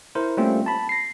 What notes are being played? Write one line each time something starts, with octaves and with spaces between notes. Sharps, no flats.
E4 A#4 C5
G3 A3 A#3 C4 C#4 F4
A5 B5
A#6 C7